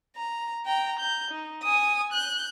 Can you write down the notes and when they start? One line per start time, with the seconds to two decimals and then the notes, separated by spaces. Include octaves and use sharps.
0.16 A#5
0.66 G5 A#5
1.00 A#5 G6
1.31 D#4
1.63 G#5 D#6
2.13 F#6 G6